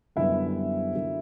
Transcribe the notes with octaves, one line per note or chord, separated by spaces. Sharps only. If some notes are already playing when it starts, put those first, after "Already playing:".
F#2 D3 G3 B3 E4 E5
D3 F#3 A#3